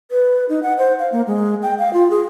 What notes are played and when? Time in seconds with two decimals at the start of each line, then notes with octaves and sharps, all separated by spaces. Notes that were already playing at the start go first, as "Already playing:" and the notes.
0.11 B4
0.49 D#4
0.63 F#5
0.78 C5
0.99 F5
1.12 A#3
1.27 G#3
1.62 G5
1.79 F5
1.93 F4
2.10 G#4